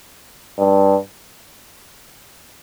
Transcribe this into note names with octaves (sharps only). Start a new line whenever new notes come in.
G2